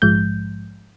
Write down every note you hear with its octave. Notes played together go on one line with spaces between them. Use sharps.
A#1 G#2 F3 G#3 G6